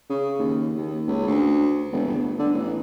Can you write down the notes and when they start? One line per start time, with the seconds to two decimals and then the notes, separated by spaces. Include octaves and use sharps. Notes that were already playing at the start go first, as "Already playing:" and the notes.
0.09 C#3
0.39 D#2
0.77 D#2
1.07 C#2
1.27 D2
1.92 E1
2.07 G1
2.39 D3
2.53 A1